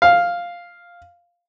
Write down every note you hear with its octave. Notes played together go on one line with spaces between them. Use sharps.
F5